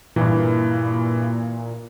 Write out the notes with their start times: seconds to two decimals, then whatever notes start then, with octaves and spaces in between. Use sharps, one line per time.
0.16 G2 A#2 E3